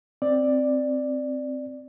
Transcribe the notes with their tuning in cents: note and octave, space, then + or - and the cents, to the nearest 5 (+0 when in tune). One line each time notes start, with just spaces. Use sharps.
C4 +0 D5 +5